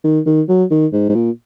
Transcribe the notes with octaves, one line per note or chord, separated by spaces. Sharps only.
D#3
D#3
F#3
D#3
G#2
G#2
A#2